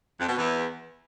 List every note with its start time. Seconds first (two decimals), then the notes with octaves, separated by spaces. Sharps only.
0.19 F2
0.27 B2
0.35 E2